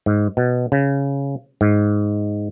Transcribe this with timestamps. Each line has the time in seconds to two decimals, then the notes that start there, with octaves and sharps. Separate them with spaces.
0.06 G#2
0.37 B2
0.72 C#3
1.61 G#2